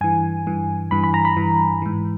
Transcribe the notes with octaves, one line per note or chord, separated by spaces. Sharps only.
G2 E3 G#5
G2 E3
G2 E3 B5
B5
A#5
B5
G2 E3
G#2 E3